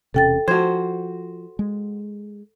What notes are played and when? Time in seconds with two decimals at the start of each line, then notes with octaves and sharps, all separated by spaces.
0.14 E1 C3 C#4 A4 G5 A6
0.48 F3 F#4 C5 G#6
1.59 G#3